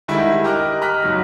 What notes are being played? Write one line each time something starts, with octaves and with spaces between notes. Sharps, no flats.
D3 D#3 G3 G#3 E4
G4 A#4 D#5 D6 F6 F#6
D#5 A#5 F6 F#6 B6
F#1 F#3 D#4 F6